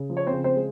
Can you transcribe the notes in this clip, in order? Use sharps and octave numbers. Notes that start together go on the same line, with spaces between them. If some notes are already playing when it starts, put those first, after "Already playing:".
Already playing: C#3
F3
C#5
C4 C5
C#3
C4 C5
G#3